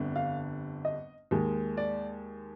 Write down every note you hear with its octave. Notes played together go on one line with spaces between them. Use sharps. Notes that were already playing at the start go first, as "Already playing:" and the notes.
Already playing: G1 F2 D3 G3
F5
D#5
D#2 D#3 G#3
D5